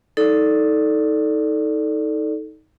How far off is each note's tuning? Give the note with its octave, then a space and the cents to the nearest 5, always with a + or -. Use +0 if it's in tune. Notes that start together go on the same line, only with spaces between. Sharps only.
D#4 +25 A4 +0 D5 +0